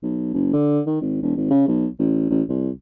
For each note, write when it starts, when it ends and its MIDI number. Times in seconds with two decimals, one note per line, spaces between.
0.03 0.31 35
0.34 0.49 30
0.53 0.81 50
0.86 0.98 51
1.01 1.21 32
1.22 1.36 28
1.37 1.49 32
1.50 1.65 49
1.68 1.86 35
1.99 2.30 33
2.30 2.42 33
2.49 2.70 36